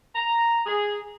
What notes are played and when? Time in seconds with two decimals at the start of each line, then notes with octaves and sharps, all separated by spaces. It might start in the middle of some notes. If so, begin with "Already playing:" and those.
0.15 A#5
0.66 G#4